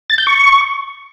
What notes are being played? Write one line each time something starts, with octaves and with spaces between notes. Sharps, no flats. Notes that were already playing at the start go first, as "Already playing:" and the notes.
A6
G6
C#6